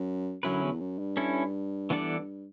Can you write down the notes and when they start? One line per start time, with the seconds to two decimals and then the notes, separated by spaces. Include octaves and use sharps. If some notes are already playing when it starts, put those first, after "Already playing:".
Already playing: F#2
0.43 F#2 D3 F#3 C#4 E4 B4
0.63 E2
0.80 F#2
0.99 G2
1.17 C#4 E4 A4
1.90 E3 B3 D4 A4 D5